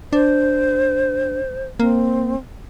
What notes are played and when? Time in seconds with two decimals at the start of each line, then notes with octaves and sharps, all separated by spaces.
0.13 D4 C5
1.80 A#3 C4